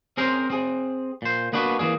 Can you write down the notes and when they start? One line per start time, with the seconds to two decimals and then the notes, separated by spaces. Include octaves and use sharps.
0.17 C4 C#4 G#4 A#4 C5 C6
0.50 C4 G#4
1.22 A#2 C5
1.53 A#3 B3 D4 F#4 B4
1.79 E3 F#3 A#3 G#4